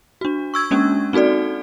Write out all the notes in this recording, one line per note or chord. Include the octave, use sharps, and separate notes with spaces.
D4 F#4
C#6 E6 G#6
G#3 A#3 C#4 D4
C4 D#4 F#4 A4 D5